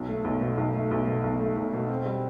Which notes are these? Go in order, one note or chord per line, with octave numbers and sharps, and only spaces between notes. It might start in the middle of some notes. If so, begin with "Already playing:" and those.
Already playing: B1
A3
B1
B2
B1
A3
B1
B2
B1
A3
B1
B2
C4
G3